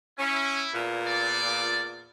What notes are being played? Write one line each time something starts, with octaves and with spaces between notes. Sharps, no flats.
C#4 E4
E2 A#2
D5